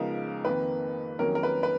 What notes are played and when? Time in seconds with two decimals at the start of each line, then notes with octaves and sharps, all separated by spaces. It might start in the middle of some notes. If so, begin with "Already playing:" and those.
Already playing: C#2 C#3 F3 B3 D#4 A#4
0.45 F2 D#3 A#3 B4
1.19 F2 D#3 F#3 A#3 C#4 A#4
1.35 A#4
1.43 B4
1.63 B4